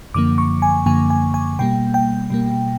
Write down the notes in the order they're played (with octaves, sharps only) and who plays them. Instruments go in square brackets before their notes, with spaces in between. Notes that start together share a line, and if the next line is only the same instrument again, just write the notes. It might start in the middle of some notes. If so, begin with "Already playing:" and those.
[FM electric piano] F#2 D3 F3 A#3 D6
C#6
G#5
F#2 D3 F3 A#3 G#5
G#5
G#5
B2 G3 A#3 G5
G5
B2 G3 A#3